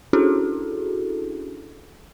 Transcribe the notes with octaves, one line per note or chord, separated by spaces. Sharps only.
C#4 D4 E4 F#4 G#4 A4